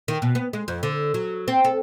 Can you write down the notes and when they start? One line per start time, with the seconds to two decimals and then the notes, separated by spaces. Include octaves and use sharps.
0.08 D#3
0.22 B2
0.35 B3
0.53 G#3
0.68 F2
0.83 D3
1.14 F#3
1.48 C4
1.65 A4